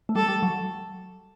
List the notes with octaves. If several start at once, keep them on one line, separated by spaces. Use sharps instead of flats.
A3
G3 A4
G3
F#3